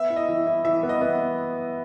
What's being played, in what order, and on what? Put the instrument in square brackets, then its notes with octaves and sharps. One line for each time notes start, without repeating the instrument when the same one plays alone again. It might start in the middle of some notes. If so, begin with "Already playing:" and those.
Already playing: [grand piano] B3 [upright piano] E5
[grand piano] E4
[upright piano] D#5
[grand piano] E3
E4
[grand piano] E3 [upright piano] E5
[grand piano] B3
[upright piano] D#5
[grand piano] B3